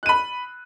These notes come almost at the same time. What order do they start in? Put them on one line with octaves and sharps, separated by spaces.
F#6 D#7 B5